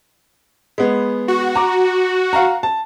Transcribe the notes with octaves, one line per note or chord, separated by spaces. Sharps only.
G#3 B3
F#4
A#5 D6
F5 F#5 A#5
A5